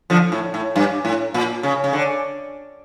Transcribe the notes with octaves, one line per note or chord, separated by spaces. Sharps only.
D3 F3
A2
A2
G2
A2
A#2
C#3
C#3
D3